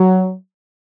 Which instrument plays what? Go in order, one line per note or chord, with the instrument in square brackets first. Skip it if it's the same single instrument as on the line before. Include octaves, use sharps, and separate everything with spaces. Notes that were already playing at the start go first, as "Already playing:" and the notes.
Already playing: [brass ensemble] F#3